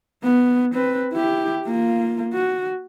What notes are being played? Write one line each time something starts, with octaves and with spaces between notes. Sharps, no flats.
B3
C4 B4
E4 G4
A#3 F4
F#4